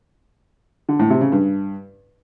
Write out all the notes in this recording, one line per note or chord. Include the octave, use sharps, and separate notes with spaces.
D3
A2
C3
C#3
G2